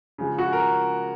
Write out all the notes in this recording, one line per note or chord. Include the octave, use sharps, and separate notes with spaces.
C#3 F3 G#3
F#4
A#4